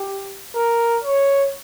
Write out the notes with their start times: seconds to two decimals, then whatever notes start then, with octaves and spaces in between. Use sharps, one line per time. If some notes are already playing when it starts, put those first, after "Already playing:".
Already playing: G4
0.56 A#4
1.03 C#5